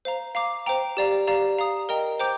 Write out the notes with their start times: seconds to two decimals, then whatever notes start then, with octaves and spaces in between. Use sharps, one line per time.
0.05 C5 F5 A#5
0.35 F5 A#5 D6
0.66 C5 G5 A#5
0.97 G4 D5 F5 A#5
1.27 G4 D5 F5 A#5
1.59 F5 A#5 D#6
1.89 A#4 D#5 G5 A#5
2.20 C5 G5 A#5 D6 G6